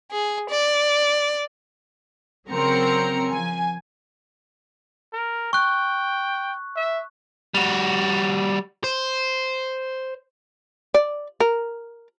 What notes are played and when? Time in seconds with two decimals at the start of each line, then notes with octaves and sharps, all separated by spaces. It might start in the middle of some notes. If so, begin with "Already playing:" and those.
0.12 G#4
0.50 D5
2.49 C#3 F#3 C4 A#4 A#5 C#7
3.30 F3 G#5
5.13 A#4
5.53 G5 C#6 F#6
6.76 E5
7.54 G3 F#4
8.84 C5
10.94 D5
11.40 A#4